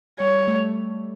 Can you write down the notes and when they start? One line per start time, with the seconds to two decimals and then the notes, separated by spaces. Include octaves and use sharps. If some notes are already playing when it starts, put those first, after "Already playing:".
0.20 G3 C#5
0.48 A3